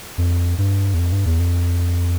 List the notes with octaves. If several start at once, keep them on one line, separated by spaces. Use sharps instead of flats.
F2
G2
E2
F2
G2
E2
F2